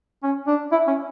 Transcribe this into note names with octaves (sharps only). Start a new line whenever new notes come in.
C#4
D4
E4
C#4